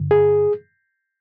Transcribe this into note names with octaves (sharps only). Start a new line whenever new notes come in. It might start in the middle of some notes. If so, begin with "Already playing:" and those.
Already playing: G2 D3
G#4